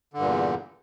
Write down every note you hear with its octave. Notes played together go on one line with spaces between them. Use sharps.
E2 G2 A#2 D3